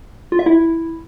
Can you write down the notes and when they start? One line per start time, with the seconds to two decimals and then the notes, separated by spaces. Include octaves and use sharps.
0.32 F4
0.39 E5
0.46 E4